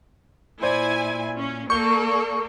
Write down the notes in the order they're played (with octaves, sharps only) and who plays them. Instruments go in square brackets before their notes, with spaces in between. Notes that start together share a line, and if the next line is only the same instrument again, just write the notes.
[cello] A#2 [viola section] E4 G#5 [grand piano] C5 D5
[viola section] C#4
[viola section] A#3 [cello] A4 D5 [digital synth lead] C#6 [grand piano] G6 G7